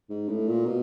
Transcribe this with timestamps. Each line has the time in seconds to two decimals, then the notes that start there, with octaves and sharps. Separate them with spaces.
0.10 G#2
0.29 A2
0.48 A#2
0.66 B2